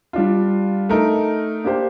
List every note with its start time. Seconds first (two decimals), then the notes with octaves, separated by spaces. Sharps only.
0.13 G3 D4 F4
0.89 A3 D#4 A#4
1.64 A#3 D4 G4 C5